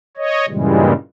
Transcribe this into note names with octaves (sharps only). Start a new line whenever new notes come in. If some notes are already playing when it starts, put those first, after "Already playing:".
C#5 D#5
G2 A#2 C#3 E3 G3 G#3